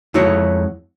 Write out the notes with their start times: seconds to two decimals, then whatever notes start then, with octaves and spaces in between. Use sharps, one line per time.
0.14 F2 G#3 E4 F#4 C#5